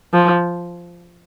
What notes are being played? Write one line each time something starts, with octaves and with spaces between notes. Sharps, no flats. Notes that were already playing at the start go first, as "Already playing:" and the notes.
F3